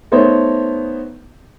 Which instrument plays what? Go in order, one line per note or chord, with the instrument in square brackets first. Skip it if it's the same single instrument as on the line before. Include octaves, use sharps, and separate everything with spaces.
[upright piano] A3 B3 D#4 C5 C#5